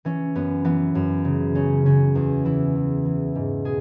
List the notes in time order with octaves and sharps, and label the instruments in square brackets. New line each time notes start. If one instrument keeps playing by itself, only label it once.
[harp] E3 C#4
F#2 B3
E3 B3
F#2
C#3
C#3 C#4
C#3 C#4
E2
E3 E4
E3
E3
G#2
B2 G#4